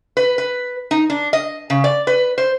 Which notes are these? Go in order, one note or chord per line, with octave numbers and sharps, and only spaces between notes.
B4
B4
D#4
D4
D#5
C#3
D5
B4
C5